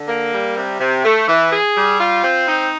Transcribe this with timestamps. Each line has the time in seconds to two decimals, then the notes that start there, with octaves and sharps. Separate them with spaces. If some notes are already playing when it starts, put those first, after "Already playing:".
Already playing: D3
0.08 A#3
0.33 G3
0.56 C3
0.80 C3
1.04 A3
1.28 E3
1.53 G#4
1.77 G3
2.00 F4
2.24 C4
2.47 D#4